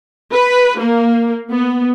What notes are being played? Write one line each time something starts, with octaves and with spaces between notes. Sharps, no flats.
B4
A#3
B3